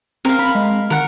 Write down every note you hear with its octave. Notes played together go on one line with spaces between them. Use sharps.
C4 A#4 F5
B5
G#3
D#3 A#4 F#5